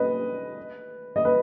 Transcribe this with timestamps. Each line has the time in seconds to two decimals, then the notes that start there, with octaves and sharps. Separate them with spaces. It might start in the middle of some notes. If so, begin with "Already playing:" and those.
Already playing: B4 D#5
1.16 D#5
1.25 B4